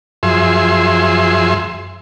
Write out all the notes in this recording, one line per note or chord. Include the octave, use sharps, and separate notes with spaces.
F#2 F3 G#4 E5 C6